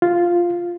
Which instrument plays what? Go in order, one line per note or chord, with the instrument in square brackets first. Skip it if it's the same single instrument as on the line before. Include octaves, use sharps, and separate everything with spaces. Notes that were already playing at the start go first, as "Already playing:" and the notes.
[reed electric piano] F4